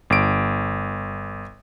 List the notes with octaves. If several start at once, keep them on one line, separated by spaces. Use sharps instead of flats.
G1 D7